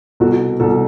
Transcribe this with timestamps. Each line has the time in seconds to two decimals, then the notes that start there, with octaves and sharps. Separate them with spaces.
0.20 C2 B2 F#4 A4
0.60 C2 F#4 A4
0.63 B2